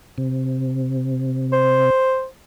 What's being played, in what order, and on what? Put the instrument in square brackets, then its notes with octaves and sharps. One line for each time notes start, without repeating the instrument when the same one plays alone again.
[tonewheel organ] C3
[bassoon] C5